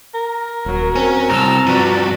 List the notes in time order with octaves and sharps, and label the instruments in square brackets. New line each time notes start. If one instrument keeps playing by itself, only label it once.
[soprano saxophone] A#4
[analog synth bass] D#1 [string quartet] F#3
[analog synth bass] C4 [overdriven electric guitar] C#4
[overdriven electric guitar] C2 G#2 [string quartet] A5 E6 F6 [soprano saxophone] A#5
[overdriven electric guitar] G2 F3 [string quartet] F#4 B4 D5